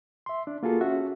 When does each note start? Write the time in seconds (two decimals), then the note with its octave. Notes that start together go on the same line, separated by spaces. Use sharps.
0.26 E5 C6
0.47 D4
0.63 A#3 F4 F#4 G#4 A4
0.81 C#4 F#4 E5